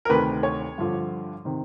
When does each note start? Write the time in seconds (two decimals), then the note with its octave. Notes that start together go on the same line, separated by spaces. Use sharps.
0.05 A#4
0.09 D2 C3 D#3 B4
0.43 C#5
0.78 G2 D3 F3
1.45 C3 D#3